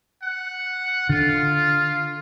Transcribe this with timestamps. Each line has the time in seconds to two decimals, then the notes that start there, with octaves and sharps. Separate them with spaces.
0.24 F#5
1.09 D3 F4